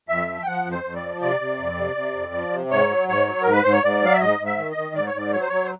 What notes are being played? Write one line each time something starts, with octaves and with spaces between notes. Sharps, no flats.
F2 E5
F3
G5
F3 F#5
F2
C5
F2
D5
F3
C3 D5
C3
F2
C3
C3
F2
F3
C3
G#2 C#5
F#3
G#2 C#5
F#3
G#2 A#4
B4
G#2 C5
C#5
G#2 D5
F#3 F5
E5
G#2 D#5
G#2
E5
D#3
D#5
D#3
G#2 D5
C#5
G#2 D5
F#3 C#5
C5
F#3 C#5
C5